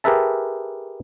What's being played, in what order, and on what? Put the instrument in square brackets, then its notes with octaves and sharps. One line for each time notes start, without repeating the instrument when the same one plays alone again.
[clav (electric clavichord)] G4 G#4 A#4 B4 E5 A5